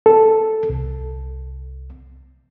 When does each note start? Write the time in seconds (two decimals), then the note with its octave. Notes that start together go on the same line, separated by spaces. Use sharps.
0.06 A4
0.70 C2